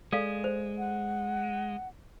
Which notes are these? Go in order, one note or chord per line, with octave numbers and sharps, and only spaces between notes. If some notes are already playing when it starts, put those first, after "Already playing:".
G#3 A4 D5 F5
C5
F#5